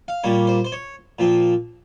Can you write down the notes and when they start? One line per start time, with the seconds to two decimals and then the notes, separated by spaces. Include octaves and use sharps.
0.08 F5
0.24 A#2 G3 A#3 C#5
0.47 C5
0.65 C5
0.72 C#5
1.19 A#2 F3 C4